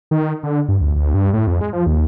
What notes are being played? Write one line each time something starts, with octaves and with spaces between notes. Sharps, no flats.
D#3
D3
G2
D2
D2
G2
A2
F2
G#3
F3
D#2